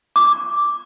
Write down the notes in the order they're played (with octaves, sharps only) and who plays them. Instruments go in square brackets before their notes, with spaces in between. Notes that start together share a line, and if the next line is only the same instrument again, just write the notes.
[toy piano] D#4 D6